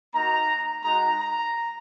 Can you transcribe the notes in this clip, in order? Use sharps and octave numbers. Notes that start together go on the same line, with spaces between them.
A#3 D#4 F#4 A#5
G#3 D#4 F#4 A#5
A#5